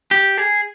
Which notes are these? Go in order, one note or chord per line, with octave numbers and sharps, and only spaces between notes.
G4
G#4